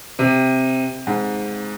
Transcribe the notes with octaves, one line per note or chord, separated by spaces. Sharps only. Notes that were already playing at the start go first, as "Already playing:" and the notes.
C3
G#2